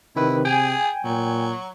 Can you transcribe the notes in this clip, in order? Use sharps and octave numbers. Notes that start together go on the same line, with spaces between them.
C3 D#3 E4 B4
G#4 G5 G#5
A#2 F#3